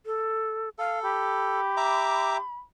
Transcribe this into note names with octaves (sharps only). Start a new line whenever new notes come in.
A4
A4 F5
G4 B5
E5 A#5 D6